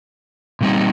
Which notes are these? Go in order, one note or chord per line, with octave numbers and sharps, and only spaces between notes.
A#2 G3 C4 D#4